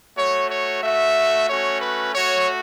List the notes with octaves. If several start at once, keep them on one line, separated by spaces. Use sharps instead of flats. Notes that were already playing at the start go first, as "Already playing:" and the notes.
A3 F#4 C#5
C#5
A3 F#4 E5
A3 C#4 F#4 C#5
B4
A3 F#4 C#5